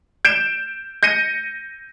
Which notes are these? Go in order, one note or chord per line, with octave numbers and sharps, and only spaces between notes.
G6 D7 E7
G6 A#6 C#7 D#7